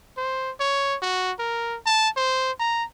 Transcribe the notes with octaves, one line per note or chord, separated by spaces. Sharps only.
C5
C#5
F#4
A#4
A5
C5
A#5